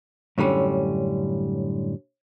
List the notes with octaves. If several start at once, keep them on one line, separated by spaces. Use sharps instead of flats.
F#2 A2 D3 G3 C#4